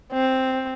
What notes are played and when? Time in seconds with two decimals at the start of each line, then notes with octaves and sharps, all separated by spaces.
0.13 C4